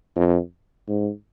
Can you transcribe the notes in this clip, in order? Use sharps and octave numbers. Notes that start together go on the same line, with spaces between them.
F2
G#2